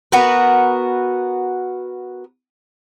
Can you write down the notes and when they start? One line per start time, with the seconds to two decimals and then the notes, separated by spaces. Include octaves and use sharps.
0.12 B3 F#4 A#4 B4